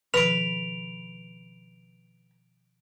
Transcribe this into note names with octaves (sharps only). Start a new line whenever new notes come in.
B2 D#3 F3 B4 D7 F7